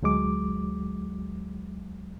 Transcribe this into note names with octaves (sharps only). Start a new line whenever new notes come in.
D2 F#3 G#3 D6